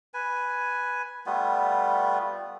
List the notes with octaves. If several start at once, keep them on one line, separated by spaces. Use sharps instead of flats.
B4 G#5
G3 A3 B3 F4